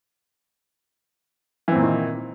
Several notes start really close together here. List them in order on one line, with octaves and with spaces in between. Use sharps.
E3 C4 A#2 A#3 D#3